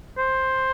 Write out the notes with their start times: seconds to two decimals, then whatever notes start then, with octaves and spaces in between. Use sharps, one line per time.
0.18 C5